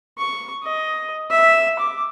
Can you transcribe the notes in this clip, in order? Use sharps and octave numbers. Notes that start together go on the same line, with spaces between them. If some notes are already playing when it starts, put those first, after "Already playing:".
C#6
D#5
E5
D6